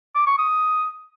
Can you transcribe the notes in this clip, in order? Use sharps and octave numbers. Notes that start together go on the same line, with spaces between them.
D6
C#6
D#6